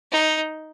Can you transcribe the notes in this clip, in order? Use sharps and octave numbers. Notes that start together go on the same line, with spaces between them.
D#4